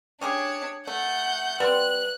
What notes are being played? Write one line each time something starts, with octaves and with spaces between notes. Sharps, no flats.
C#4 D4 G4 G#4 C#5
A3 F#5 G6
G3 C4 B4 F#6